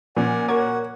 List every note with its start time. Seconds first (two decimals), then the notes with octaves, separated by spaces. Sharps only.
0.17 A#2 F3 C#4 D5 F#5 G#5
0.48 F#4 A#4 C#5 F#5 D6 G#6